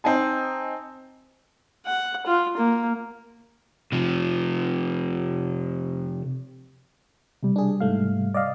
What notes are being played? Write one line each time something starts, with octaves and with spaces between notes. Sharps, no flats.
C4 D#4 G#5 A5
F#5
F4
A#3
C3 F3
C3 G3
D4 G#4
G#2 A3 F5
D5 D#5 F5